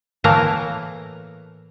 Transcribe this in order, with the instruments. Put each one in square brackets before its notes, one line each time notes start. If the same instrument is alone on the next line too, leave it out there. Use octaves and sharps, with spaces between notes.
[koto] A2 E3 A3 A#3 A#4 A#5